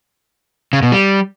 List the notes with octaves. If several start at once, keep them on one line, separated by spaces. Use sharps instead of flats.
C#3
B2
G3